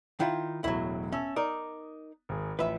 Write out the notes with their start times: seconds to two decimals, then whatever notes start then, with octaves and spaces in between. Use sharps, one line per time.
0.20 D#3 E4 F4
0.64 E1 A2 F#3 E4
1.12 C#4 E5 A5 E6
1.36 D#4 A#4 D5 D#6
2.29 G#1 G#4
2.59 A1 F3 B4 E5